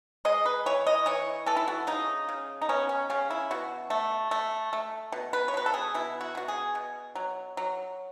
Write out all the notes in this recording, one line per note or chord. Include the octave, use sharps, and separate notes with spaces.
G#3 D#5
B4
E3 C#5
D#5
E3 C#5
E3 A4
E4
F#4
C#3 D#4
C#3
D#4
B3 C#4
C#4
C#3 C#4
E4
B2 F#4
A3
A3
A3
B2
B4
C#5
B2 B4
A4
G#4
B2 E4
F#4
B2 F#4
G#4
B2
F#3
F#3